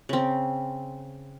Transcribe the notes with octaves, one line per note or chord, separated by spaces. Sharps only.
C#3 C4